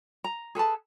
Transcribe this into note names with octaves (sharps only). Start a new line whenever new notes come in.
A#5
G#4 A4 B4 A5